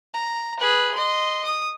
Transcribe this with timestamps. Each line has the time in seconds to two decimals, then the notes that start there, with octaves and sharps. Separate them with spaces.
0.14 A#5
0.60 G#4 B4
0.95 D#5 C6
1.45 D#6